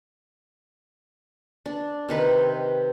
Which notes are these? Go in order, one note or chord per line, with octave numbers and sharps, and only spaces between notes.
D4
C3 D#3 B4